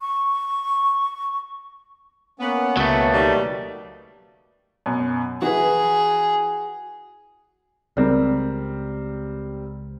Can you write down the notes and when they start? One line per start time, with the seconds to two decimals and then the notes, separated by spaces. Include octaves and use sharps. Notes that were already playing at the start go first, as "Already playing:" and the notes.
0.01 C#6
2.40 A#3 B3 C#4
2.77 C#2 B2 F#3 A3 A#3
3.12 D#3 G3
4.86 F#2 B2
5.42 E3 F#4 G#4 B4
7.97 C#2 G3 C4 A#4